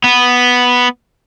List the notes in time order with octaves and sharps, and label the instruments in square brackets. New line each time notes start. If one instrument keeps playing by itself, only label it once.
[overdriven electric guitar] B3